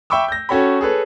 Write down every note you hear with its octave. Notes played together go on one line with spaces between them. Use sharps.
E5 G5 B5 C#6 D6 E6
G6 A#6
C#4 F#4 A4 C#5 G5 B5
G#4 A4 B4 C#5